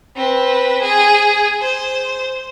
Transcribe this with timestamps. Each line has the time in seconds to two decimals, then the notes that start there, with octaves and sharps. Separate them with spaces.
0.17 C4 B4
0.82 G#4
1.61 C5